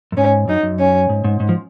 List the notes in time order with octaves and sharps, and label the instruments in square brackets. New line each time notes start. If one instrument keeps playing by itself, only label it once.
[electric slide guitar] F#2
[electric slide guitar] G#2 [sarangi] C#4
[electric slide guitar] F#2 [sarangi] D#4
[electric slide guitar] F#2
[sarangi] C#4
[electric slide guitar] G#2
G#2
G#2
F3